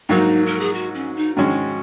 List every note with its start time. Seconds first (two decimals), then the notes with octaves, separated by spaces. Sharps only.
0.09 G#2 F#3 A#3 D#4
0.46 A#4
0.60 G#4
0.73 F#4
0.94 C#4
1.16 D#4
1.37 G#2 D#3 G#3 C#4 F#4